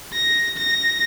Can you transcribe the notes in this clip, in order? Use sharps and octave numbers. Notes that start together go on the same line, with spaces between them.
A#6
A#6